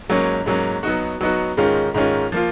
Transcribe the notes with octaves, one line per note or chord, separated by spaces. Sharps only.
G#2 F#3 A#3 C#4
G#2 F#3 A#3 C#4
F#3 B3 D#4 F#4
F#3 B3 D#4 F#4
G#2 D#3 G#3 C#4 F4
G#2 D#3 G#3 C#4 F4
F3 A#3 F4